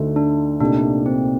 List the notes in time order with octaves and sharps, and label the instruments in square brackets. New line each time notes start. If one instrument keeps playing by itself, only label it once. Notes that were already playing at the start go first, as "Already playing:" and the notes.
Already playing: [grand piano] D2 D3 A3 D#4
[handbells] D4
[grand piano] C2 A#2 A3 D#4 G4 [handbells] D4
[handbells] C4